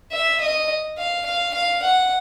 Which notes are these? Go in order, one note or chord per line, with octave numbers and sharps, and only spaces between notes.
E5
D#5
F5
F5
F5
F#5